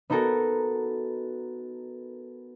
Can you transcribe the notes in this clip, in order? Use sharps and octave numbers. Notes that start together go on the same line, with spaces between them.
B3 D#4 F#4 A4 A#4